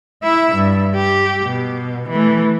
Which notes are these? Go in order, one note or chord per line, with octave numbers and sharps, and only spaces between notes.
E4 E5
G2
G4
B2
E3 A3